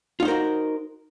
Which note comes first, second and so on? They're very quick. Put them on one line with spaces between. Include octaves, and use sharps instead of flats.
F4 D#4 C5 A#4 F#4